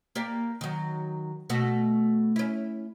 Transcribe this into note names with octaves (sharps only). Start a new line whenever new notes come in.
A#3 G4 D5
D#3 F#3
B2 A3 F#4
C#4 E4